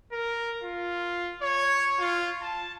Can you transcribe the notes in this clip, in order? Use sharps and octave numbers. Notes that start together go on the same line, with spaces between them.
A#4
F4
C#5
F4
A5